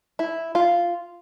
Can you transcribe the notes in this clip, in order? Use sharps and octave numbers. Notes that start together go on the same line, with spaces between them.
E4
F4